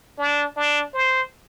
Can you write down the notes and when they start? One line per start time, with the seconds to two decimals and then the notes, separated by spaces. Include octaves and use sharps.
0.18 D4
0.56 D4
0.94 C5